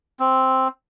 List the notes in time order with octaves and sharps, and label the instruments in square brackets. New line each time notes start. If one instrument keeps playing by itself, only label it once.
[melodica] C4